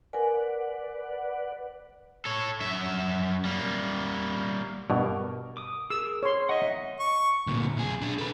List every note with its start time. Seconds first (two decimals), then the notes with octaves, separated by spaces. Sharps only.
0.13 A#4 B4 D5 F#5 G#5
2.25 A4 C#5
2.61 F#2 E5
3.45 G3 A#3
4.90 G2 B2 A#4
5.57 D6 D#6
5.90 G#4 A#4 E6
6.23 C#5 C6
6.49 D#4 D#5 E5 F#5
6.99 C#6
7.47 D2 A#2
7.77 B1 G#4
8.02 D4 G#4
8.18 A4 B4